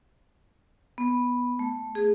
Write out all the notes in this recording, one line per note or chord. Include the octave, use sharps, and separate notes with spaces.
B3
A3
G#4